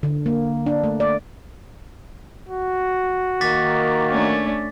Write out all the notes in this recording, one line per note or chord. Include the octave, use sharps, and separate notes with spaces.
D3
A#3
D4
A3
D5
F#4
D#3 A#3 D6 A6 B6
A3 C#4 D4